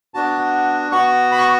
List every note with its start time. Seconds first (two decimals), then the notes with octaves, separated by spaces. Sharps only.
0.14 B3 D4 F#4 A5
0.92 B3 F#4 C#6
1.32 B5
1.38 C#6